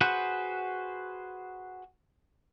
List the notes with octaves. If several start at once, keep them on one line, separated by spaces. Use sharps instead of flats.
F#4 G#4 B4 C5 F#5